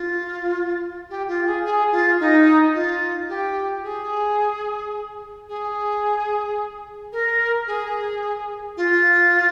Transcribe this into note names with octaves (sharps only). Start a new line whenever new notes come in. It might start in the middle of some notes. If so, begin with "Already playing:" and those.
Already playing: F4
G4
F4
G#4
G#4
F4
D#4
F4
G4
G#4
G#4
A#4
G#4
F4